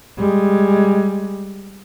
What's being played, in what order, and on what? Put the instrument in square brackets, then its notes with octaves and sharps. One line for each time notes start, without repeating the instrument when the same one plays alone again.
[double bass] G3 G#3